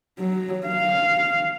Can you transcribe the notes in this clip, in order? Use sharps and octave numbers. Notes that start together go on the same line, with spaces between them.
F#3
F5